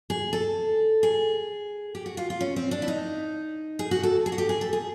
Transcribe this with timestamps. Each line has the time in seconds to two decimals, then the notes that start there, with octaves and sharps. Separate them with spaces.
0.10 G#4
0.33 A4
1.03 G#4
1.95 G4
2.06 F#4
2.17 F4
2.30 F4
2.41 C#4
2.56 C4
2.71 D4
2.82 E4
2.88 D#4
3.79 G#4
3.91 F#4
4.03 A4
4.26 G#4
4.32 F#4
4.38 G4
4.49 G#4
4.61 A4
4.73 G#4